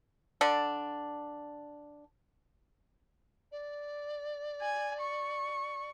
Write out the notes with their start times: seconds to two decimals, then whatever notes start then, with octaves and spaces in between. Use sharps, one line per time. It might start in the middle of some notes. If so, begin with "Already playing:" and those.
0.41 D3 D4
3.52 D5
4.62 G#5
5.01 C#6